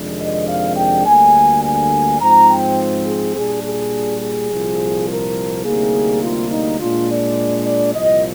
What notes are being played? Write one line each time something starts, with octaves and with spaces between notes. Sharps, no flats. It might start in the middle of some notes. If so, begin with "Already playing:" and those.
Already playing: F2 C3 D#3 G#3 D4
D#5
F5
G5
D2 D3 G3 A#3 G#5
G#5
G#2 F3 C4 A#5
G5
G#4
A#2 G3 D4 G#4
G#4
G#4
C2 A#2 F3
A#4
D2 C3 G3 A#3 D#4 G#4
F4
D#4
A#2 G#3 D4 F4
D5
D5
C2 A#2 F3 D#5